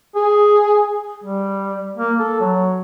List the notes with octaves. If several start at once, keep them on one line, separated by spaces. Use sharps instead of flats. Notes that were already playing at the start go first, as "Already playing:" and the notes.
G#4
G3
A#3
A4
F#3